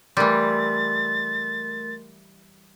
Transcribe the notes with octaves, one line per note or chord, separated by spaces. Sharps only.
E3 G3 A3 A#4 C6 A6